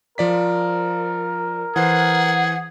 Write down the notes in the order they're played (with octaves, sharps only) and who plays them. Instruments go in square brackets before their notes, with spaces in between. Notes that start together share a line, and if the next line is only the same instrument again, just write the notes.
[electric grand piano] F3 D5 B6 [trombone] A#4
[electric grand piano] E3 C5 C7 [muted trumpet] G#4 [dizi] F#5